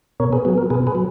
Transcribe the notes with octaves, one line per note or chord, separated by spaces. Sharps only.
B2 A#4 C#5
G#4 B4
F#3 B3 G#4
A#4
B2 G#4 B4
G#4 B4
F#3